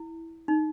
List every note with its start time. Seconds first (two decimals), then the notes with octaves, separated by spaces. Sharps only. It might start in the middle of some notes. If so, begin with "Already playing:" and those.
Already playing: E4
0.48 D#4